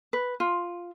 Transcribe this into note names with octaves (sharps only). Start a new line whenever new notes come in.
B4
F4